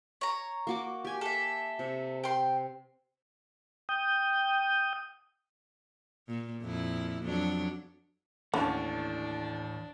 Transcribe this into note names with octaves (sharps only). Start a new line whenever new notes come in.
C#5 A#5
A#3 F#4 D6
G4 G#5
A4 E5
C3
G5 C6
G5 D#6 G6
A#2
F2 A#2 E4
F2 F#3 D4
D#2 A2 D3 E3 A3 C#4 D4 A5